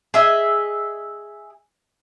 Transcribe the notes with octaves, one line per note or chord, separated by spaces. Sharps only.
G#4 D#5 E5